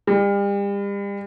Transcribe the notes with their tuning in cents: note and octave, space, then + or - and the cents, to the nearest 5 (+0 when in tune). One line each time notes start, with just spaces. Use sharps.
G3 +40